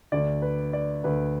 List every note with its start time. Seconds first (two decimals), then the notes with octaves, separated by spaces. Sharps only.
0.12 D2 D3 D5
0.42 B4
0.73 D5
1.04 D2 D3 B4